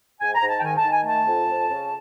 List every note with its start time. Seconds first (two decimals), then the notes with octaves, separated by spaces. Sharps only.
0.21 G#2 G#5
0.35 A#5
0.42 G#2
0.49 A5
0.59 G5
0.63 D#3 G#5
0.77 A5
0.85 D#3
0.91 G#5
1.06 A3 A5
1.26 F2
1.48 F2
1.70 C#3